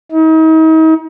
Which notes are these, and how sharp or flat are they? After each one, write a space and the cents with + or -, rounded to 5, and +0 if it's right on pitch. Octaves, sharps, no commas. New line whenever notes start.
D#4 +40